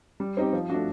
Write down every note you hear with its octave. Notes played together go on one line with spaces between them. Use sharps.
G3
C4 D#4 G4
F3
A3 D4 F#4